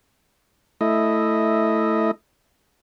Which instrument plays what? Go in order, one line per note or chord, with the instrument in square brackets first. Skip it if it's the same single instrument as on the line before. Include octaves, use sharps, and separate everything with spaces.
[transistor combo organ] A3 E4 D#5